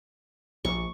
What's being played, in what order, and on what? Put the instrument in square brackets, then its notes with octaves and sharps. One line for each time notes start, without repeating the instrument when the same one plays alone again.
[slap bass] A#1 [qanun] C#6